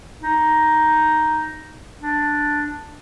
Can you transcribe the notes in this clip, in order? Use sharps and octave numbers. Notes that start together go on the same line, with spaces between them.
D#4
D4